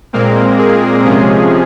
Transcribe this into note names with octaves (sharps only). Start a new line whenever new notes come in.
A#2 G#3 A#3 C4 A#4
G#4
C3 F3 G#3 C#4 G#4